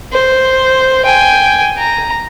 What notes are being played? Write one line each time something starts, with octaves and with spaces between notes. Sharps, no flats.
C5
G5 G#5
A#5